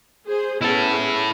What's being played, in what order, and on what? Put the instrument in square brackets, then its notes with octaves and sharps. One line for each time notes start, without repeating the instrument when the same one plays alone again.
[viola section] G#4 C5
[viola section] B3 C#4 G#4 [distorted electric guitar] E4 A4